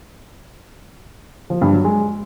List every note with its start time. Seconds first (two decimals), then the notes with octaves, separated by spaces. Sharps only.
1.50 F3
1.61 G2
1.73 F#3
1.84 G#3